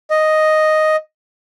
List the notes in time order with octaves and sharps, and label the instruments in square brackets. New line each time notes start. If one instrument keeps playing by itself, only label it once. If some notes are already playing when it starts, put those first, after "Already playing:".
[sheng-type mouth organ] D#5